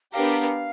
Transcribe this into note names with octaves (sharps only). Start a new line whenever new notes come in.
B3 D4 G4 A#4 F5